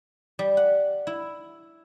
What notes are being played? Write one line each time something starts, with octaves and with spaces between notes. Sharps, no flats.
G3
F#5
E4